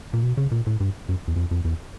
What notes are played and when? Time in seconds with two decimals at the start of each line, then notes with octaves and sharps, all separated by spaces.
0.13 A#2
0.23 B2
0.37 C#3
0.51 A#2
0.67 A2
0.80 G2
1.09 F#2
1.28 E2
1.36 F2
1.51 F2
1.65 E2